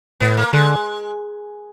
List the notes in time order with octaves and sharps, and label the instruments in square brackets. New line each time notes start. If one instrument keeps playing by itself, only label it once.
[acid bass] A2 [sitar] B3
[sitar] A#3
[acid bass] D3 [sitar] G#3